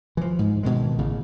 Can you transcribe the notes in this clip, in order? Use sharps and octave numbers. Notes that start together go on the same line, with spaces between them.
E3 F3
G#2
B2 D#3 G#3
A1 C#3